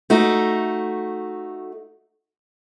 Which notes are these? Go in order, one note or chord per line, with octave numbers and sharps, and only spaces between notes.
A3 D#4 F#4